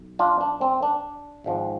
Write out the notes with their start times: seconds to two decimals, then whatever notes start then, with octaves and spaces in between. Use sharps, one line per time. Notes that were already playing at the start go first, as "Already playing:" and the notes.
Already playing: B1
0.19 D4 F4
0.41 D4
0.61 C4
0.82 D4
1.44 G#1 G#2 F3